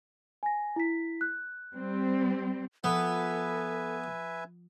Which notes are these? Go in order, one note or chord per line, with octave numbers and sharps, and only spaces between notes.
G#5 A#6
E4 B6
F#6
G3 C4
F3 B3 A4 B4 E5 G#5